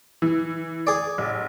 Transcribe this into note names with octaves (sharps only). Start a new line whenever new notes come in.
E3
G#4 D5
A1